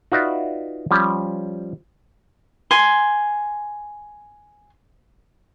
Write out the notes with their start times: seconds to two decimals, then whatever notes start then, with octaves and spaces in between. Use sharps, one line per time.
0.12 D#4 F4 F#4 B4 D5 E5
0.91 F3 G3 C#4
2.71 G#5 C6